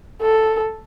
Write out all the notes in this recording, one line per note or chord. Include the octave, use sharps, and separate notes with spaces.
A4